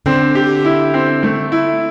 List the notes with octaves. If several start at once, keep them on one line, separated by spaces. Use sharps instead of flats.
D3 C4
G4
E4
C4
A3
E4